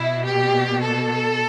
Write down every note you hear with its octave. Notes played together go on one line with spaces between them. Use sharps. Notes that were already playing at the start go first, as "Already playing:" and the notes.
Already playing: B2 E4
G4
A4